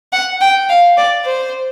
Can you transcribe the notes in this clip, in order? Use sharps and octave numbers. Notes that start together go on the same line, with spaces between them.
F#5
G5
F5
D5
C5